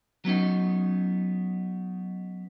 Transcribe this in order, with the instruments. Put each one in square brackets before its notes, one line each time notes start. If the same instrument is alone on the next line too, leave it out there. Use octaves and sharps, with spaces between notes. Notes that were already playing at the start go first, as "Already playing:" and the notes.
[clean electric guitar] F#3 B3 C#4 D#4